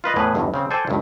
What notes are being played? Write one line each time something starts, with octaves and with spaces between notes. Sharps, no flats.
F4 B4 D#5
E2 A2 G#4 B4
G1 E2 G2 D3
C#3 C4
A4 C5 D5 G5 G#5
C#2 G2